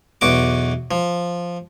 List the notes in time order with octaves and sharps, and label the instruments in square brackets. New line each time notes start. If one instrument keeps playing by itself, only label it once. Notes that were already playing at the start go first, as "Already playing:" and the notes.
[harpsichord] B1 E2 F#4 D6
F3